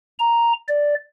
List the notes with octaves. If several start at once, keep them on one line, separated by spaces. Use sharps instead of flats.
A#5
D5